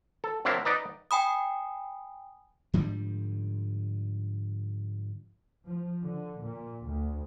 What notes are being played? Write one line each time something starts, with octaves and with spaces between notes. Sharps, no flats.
A4
F#3 C4 D4 E4 A#4 F5
D#4 B4 D5 D#5 A#5
G5 G#5 B5 D#6
G#2 D3 F3 G3
F3
D3
A#2
D2